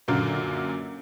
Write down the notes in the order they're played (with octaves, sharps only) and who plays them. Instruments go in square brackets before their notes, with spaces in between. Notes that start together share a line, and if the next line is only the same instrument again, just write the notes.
[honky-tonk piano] F#2 A#2 D3 A#3